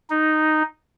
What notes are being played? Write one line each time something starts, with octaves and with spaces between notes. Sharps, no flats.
D#4